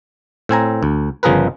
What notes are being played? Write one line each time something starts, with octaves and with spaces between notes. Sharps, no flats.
A2 C4 G#5 A#5
D2
G1 C#3 F3 G#4 A#4 B4